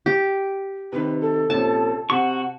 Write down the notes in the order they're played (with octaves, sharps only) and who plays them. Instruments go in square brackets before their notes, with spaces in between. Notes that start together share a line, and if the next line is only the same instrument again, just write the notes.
[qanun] G4
[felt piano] C3 D#3 [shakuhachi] B4
[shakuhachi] A4
[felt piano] A#1 C3 C#4 [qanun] A5
[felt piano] C3 [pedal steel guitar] F#4 C#6 [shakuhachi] F#5